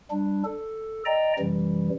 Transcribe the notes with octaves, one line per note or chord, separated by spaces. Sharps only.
G3 D4
A4
D5 D#5 G5 A#5
F#2 C3 E3 G3